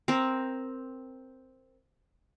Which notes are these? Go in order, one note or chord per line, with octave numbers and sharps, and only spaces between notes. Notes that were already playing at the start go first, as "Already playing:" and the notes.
C4 A#4